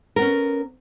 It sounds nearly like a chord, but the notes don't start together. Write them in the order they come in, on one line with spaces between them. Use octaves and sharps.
A#4 B3 C#4